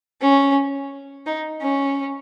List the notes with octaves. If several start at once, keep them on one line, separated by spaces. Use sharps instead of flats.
C#4
D#4
C#4